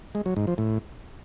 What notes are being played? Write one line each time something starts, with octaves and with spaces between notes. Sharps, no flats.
G#3
F#3
G#2
F3
A2